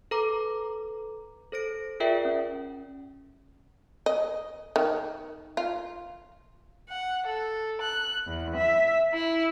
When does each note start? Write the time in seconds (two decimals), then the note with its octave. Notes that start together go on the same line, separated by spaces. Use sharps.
0.11 A4 B4 A#5 D6
1.52 A4 C5 A#6 D7
2.00 F4 G#4 A#4 D5 E5 G5
2.25 C#4
4.06 D#5
4.76 D#3
5.57 F4
6.89 F#5
7.26 A4
7.80 F#6
8.27 E2
8.56 E5
9.13 E4